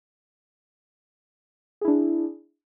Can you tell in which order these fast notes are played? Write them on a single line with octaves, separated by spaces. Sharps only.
G#4 E4 D4